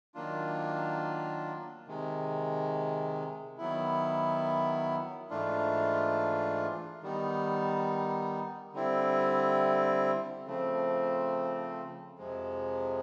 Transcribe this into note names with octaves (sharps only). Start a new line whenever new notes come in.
D#3 F#3 A#3 D4 F4
C3 D#3 G#3
D#3 F#3 B3 E4
G#2 E3 A3 D4 F4
D#3 G3 B3 D#4
D3 G3 C4 E4
C#3 F3 A3 C4
F2 C3 F3 G#3